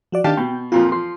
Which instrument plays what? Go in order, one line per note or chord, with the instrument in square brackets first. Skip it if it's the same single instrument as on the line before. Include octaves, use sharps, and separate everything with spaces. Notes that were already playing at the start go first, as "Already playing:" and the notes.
[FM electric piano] F3 F#4 D5
[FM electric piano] D#3 D4 [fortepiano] G4 F5 A5
[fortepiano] B2 [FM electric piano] G5
[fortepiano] F2 A#2 F3 [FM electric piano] F4
[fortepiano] F3 [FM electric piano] C6